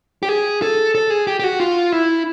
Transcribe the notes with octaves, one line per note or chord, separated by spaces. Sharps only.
G4
G#4
A4
A4
G#4
G4
G4
F#4
F4
E4